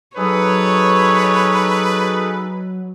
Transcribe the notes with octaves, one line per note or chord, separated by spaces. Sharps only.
F#3 D#4 G#4 A4 B4 C#5